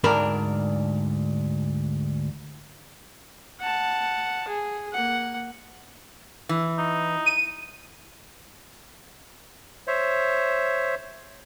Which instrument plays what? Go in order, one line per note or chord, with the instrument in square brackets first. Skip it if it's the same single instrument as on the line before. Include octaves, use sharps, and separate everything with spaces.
[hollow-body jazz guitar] D2 G#2 D4 A#4 B5
[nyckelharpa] F#5 A5
G#4
A#3 F#5
[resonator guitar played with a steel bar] E3
[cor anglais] D#4
[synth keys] D#7
[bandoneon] C5 C#5 E5